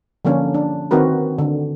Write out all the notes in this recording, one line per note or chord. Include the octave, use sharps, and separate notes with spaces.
D3 F3 A#3 C#4 D4
D4
D#3 C4 D#4 F#4 A#4 B4
D3